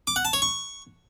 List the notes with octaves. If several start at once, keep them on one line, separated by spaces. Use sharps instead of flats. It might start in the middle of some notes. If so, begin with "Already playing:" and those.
D6
F#5
A5
C#5
C#6